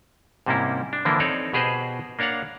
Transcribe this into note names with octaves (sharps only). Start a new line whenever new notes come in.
G#2 C3 G3 A#3 C#4 E4
D4
D3 E3 F3 A#3 D4 E4
C4 D#4 A4 C#5 D5
B2 G4 G#4 B4 C5 D#5
A#3 D4 C#5 F5 F#5